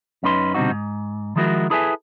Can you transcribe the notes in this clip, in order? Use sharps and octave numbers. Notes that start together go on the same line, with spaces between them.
F#2 C#4 D#4 B4 C6
B2 D3 G3 C4 D#4 F#4
G#2
D#3 F3 G#3 E4 F#4 A#4
E4 G#4 A4 B4 E5 G#5